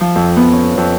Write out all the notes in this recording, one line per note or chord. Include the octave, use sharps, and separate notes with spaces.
F3
F2
B3
C#4
F2